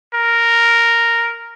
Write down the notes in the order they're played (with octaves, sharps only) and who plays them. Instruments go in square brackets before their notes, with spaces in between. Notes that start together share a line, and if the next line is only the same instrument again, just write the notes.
[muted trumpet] A#4